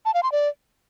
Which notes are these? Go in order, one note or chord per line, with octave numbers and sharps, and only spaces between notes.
A5
F5
C6
D5